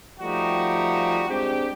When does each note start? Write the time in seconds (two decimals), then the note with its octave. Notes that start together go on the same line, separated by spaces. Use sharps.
0.20 F3 G3 A3 D#4 F#4 G4
1.29 G#3 C4 D4 G4